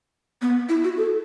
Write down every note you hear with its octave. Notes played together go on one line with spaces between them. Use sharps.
B3
E4
F#4
A4